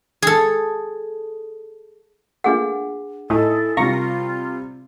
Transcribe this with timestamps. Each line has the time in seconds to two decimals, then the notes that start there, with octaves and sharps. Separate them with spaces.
0.22 G#4 A4
2.44 A3 A#3 D4 F4 G#4 F#5
3.30 A2 A3 D#4 E4 A4 G#5 D#6
3.77 C3 G3 F4 A#4 F5 C#6 A#6